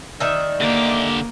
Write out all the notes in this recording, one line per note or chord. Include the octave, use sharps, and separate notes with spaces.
D#3 D5 E5
D3 A#3 G4